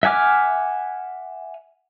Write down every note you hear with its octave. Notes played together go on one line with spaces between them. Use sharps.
E5 F#5 G#5 D6 F6